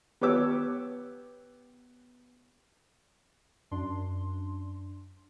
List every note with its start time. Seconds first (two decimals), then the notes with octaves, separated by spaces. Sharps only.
0.21 B3 G4 C#5 D6 E6
3.71 F#2 D4 C6